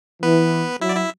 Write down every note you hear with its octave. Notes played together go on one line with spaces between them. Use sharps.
E3 B3 B4
F#3 E4 E5
D5
E4 E5